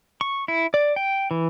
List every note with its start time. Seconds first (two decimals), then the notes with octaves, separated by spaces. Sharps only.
0.21 C#6
0.48 E4
0.74 D5
0.96 G5
1.31 E3